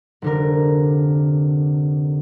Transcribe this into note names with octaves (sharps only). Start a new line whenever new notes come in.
F1 D3 A#4